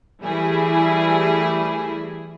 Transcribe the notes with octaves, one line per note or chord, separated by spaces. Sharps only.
E3 G3 A3 E4 G#4